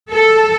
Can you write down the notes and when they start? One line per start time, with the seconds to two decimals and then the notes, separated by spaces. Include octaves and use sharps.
0.11 A4